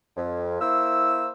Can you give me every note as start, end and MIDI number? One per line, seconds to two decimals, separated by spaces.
0.17 0.57 41
0.61 1.30 58
0.61 1.30 64
0.61 1.30 72
0.61 1.30 88